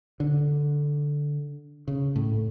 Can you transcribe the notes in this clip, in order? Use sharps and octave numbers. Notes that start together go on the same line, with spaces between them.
D3
C#3
A2